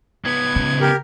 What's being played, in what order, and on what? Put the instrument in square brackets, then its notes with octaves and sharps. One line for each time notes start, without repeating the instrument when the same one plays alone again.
[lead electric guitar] C#2 B3 [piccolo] G#6
[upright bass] C#3
[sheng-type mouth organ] G4 A#4